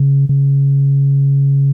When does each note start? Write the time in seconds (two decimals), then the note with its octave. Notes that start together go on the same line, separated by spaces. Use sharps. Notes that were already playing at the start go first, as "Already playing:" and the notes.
Already playing: C#3
0.29 C#3